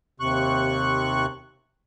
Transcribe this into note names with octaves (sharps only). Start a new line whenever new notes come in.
D#2 C3 C#6 F#6